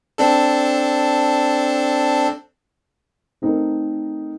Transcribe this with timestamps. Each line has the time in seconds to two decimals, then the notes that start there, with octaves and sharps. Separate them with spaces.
0.18 C4 D4 A4
3.42 A3 C4 D#4 A4 A#4